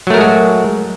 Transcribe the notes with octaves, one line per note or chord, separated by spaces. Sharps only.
F#3 G#3 A3 F#4 A#4